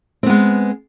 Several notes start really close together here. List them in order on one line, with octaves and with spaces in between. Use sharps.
C4 B3 G#3